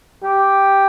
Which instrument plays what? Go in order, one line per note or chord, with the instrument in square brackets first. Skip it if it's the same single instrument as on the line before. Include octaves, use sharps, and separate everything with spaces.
[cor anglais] G4